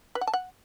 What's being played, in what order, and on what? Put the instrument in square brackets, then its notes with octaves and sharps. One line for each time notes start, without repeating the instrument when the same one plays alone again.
[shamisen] B4
F#5
A5
F#5